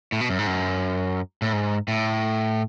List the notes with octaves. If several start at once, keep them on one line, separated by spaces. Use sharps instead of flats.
A2
B2
F#2
G#2
F#2
A2
G#2
A2